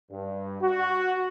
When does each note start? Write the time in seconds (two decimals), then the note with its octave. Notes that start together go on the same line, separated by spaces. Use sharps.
0.10 G2
0.61 F#4